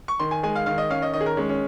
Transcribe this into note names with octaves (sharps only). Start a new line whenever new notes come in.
C#6
D#3 C6
G#5
G#3 G#5
F5
D#3 F5
D#5
C#4 F5
D#5
D#3 D#5
G#4
A#4
G#3 C#4
C#4